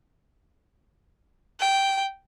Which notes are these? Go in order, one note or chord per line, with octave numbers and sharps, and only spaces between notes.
G5